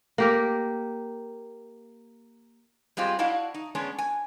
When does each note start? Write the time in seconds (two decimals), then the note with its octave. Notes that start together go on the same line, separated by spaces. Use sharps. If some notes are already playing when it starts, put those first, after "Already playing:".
0.18 A#3 G4 A#4
2.97 G3 G#3 C4 F4 G4
3.19 D4 E4 F#4 D#5 F5
3.54 D#4
3.75 G#3 B3 C#4 D4
3.98 G#5